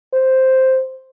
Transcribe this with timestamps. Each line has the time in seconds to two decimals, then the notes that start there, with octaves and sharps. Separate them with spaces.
0.13 C5